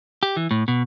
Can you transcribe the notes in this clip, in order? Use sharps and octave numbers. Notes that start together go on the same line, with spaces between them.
G4
E3
A2
B2